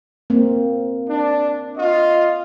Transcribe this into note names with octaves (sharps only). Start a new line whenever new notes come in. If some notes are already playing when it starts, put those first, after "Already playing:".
A#3 C4
D4
F4 D#5